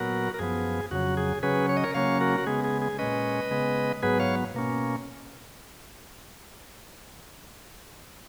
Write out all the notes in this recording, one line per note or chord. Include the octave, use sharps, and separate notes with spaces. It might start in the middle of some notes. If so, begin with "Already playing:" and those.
Already playing: A#2 F#3 B3 F#4 A#4
A#4
F#2 F3 B3 G#4
F2 C#3 F#3 F#4
G#4
C#3 F#3 C#4 G#4 B4
C#5
D#5
A#4 C#5
C#3 F#3 A#3 C#4 C#5 F5
F#4 A#4
F#4
C#3 G#3 B3 G#4
G#4
G#4
A#2 G#3 C#4 B4 D#5
C#3 G#3 B3
G#2 F#3 B3 G#4 B4
C#5 F5
B2 A#3 C#4